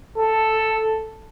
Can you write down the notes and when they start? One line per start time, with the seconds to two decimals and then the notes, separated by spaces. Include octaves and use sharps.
0.18 A4